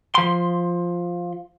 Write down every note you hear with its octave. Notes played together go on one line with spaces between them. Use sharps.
F3 C6